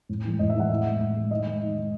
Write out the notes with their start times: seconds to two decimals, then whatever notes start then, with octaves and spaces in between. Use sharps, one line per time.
0.09 A2
0.25 E3 G#3
0.39 A2 D#5
0.50 E5
0.54 E3
0.59 G#3 F#5
0.69 A2 E5
0.85 G#3
1.01 A2
1.16 G#3
1.31 D#3 D#5
1.46 G#3
1.62 D#3
1.77 G#3